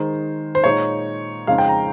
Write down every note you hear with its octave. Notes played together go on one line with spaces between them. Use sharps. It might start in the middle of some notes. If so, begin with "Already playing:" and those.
Already playing: D#3 G#3 D#4 C5
C5
A#2 G#3 D#4 C#5
F2 C#3 G#3 D#4 F5
G5
A#5